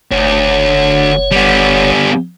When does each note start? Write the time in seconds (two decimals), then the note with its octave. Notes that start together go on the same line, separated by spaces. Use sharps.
0.11 F#1 D2 C#5
1.31 G3 B3